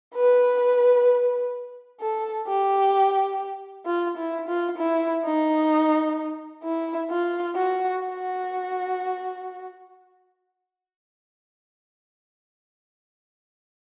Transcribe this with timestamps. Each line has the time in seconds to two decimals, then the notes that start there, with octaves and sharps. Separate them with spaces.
0.15 B4
2.00 A4
2.48 G4
3.86 F4
4.17 E4
4.48 F4
4.78 E4
5.26 D#4
6.63 E4
7.11 F4
7.56 F#4
8.03 F#4